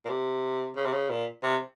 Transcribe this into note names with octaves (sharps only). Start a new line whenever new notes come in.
A#2
C3
C#3
C3
C#3
A#2
C3